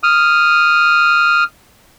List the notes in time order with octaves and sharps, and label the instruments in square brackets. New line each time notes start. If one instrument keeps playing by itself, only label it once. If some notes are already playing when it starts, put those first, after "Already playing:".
[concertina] D#6 F6